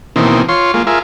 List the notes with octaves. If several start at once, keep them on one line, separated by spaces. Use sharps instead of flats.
B2 D#3 E3 A#3 C4
F4 C#5 C6
G#3 A#3 F4
F4 G#4 A#4 E5